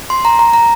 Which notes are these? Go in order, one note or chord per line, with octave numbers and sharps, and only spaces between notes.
C6
A#5
A#5
A#5